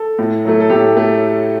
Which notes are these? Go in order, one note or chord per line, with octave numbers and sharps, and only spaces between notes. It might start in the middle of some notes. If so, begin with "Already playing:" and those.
Already playing: A4
A2
F#3 A3
A4
A2 G4
A3